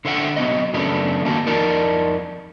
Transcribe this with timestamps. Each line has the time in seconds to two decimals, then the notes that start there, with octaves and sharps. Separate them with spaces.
0.05 D3 C5 E5 F#5 G5
0.36 F#3 B3 C4 D#5
0.73 F#2 C#3 A3 B3 D4
1.25 D#3 A#3 F#4 A5
1.46 F2 D#4 A#4 D5 A5